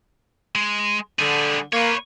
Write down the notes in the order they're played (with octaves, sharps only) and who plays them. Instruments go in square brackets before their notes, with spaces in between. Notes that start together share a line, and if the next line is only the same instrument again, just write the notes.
[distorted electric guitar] G#3
[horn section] D3 [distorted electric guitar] G3 G#4
[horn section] A#3 [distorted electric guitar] B4 C#5